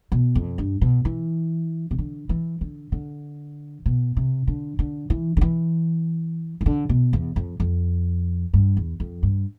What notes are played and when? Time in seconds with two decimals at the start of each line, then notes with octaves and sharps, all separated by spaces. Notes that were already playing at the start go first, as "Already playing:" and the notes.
0.12 B2
0.35 F2
0.58 G2
0.81 B2
1.05 E3
1.91 C3
1.99 D3
2.29 E3
2.61 D3
2.92 D3
3.86 B2
4.17 C3
4.47 D3
4.79 D3
5.10 E3
5.37 D3
5.41 E3
6.61 E3
6.66 D3
6.89 B2
7.13 E2
7.36 F2
7.60 F2
8.54 G2
8.77 E2
9.00 F2
9.23 G2